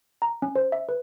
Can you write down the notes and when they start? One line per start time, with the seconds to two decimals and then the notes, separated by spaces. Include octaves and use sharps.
0.22 A#5
0.42 C#4
0.55 C5
0.72 E5
0.89 B4